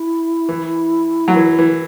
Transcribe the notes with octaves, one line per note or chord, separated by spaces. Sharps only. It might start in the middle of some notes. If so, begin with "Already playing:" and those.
Already playing: E4
E3
F#3
E3
E3